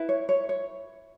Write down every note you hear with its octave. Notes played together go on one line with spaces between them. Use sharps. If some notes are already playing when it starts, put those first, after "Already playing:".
Already playing: E4 B4
C#5
C#5
C#5